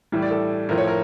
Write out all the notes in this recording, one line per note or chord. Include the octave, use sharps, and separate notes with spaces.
A2 E3 G3
D5
A4
A2 F3 A#4
C#5
A#4